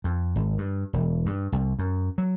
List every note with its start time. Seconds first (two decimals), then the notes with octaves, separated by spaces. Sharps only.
0.04 F2
0.36 G#1
0.58 G2
0.93 E1
1.26 G2
1.52 C2
1.79 F#2
2.18 F#3